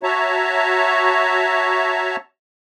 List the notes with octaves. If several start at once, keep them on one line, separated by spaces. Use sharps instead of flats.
F#4 C#5 E5 A5 A#5